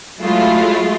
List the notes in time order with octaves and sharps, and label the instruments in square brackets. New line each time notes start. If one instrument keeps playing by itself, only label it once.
[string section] F#3 G#3 A3 E4 F4